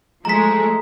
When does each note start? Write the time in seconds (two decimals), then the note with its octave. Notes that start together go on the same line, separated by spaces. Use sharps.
0.25 F3 G#3 A3 A#5 B6